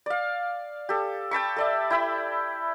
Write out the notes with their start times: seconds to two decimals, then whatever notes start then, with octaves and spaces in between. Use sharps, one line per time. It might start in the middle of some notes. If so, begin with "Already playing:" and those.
0.06 D5 F5
0.89 G4 A4
1.31 G5 A5 B5 C#6
1.56 A4 D5 E5
1.90 E4 G5 B5